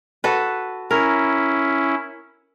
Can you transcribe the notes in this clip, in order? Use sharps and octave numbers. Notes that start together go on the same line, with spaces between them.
F#4 A4 B4
C#4 E4 A#4